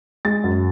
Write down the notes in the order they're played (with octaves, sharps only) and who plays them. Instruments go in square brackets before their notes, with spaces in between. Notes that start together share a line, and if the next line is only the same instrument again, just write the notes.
[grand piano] G#3 A6
F#2